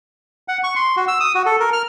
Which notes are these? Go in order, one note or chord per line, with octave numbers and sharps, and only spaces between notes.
F#5
C#6
C6
F#4
E6
D#6
F#4
A4
A#4
F6